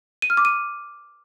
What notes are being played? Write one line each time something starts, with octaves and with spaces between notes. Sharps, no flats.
D#7
F6
D6
D#7